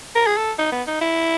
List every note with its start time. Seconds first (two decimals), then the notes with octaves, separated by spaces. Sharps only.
0.16 A#4
0.27 G#4
0.37 A4
0.59 D#4
0.72 B3
0.88 D#4
1.01 E4